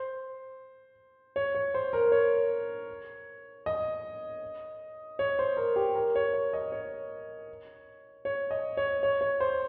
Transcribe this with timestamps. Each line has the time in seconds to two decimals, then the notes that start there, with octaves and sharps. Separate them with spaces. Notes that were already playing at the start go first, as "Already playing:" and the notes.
Already playing: C5
1.36 C#5
1.55 C#5
1.74 C5
1.93 A#4
2.12 C#5
3.66 D#5
5.19 C#5
5.39 C5
5.57 A#4
5.76 G4
5.95 A#4
6.15 C#5
6.33 C#5
6.53 D#5
6.72 C#5
8.25 C#5
8.51 D#5
8.77 C#5
9.03 C#5
9.21 C#5
9.40 C5